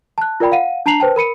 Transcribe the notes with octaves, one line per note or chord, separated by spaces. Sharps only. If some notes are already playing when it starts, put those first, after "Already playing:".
A5 F#6
F4 A#4 D5 G5 B5
F5 F#5 D#7
D4 A5 A#5 C7 F7 F#7
B4 C5 G5 A5
A#4 B5 C#7 D#7